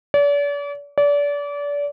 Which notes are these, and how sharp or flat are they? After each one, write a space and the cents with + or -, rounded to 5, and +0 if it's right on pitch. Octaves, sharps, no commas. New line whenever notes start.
D5 -40
D5 -30